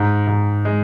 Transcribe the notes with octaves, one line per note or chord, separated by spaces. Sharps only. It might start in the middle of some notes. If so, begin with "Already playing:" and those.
Already playing: G#2
G#2
G#3